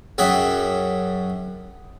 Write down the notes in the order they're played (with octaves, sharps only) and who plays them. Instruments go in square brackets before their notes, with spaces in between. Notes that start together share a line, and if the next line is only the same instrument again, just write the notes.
[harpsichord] F#2 G#4 E5 F#5 G5